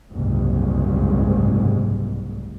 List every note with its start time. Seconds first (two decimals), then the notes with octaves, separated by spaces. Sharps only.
0.11 F#1 C2 G#2